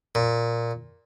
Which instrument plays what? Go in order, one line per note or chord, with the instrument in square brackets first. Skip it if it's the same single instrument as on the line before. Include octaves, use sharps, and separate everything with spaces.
[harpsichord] A#2